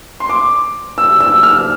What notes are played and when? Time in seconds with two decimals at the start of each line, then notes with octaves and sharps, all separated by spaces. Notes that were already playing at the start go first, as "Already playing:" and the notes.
0.20 C6
0.29 D6
0.98 E6
1.21 E6
1.43 F6